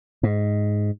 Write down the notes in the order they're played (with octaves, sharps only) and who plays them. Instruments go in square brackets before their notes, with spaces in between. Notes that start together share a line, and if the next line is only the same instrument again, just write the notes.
[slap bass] G#2